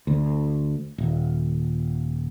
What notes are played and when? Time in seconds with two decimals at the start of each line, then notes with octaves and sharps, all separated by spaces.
0.07 D2
0.98 D#1